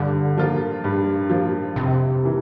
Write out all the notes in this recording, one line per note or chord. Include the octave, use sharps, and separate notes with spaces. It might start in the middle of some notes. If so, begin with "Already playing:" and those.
Already playing: G2 D3
F3 A#3 F4
G2
F3 A#3 F4
F2 C3
E3 A#3